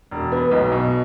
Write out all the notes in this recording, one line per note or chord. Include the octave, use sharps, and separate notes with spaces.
E1
B3
B1
B2